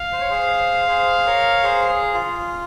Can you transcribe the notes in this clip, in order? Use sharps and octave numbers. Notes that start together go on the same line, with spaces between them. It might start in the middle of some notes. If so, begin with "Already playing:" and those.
Already playing: F5
C5
C#5
G#4 C5
G#4 C5
A#4 C#5
G#4 C5
G#4
F4